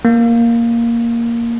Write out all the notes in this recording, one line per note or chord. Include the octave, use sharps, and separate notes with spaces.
A#3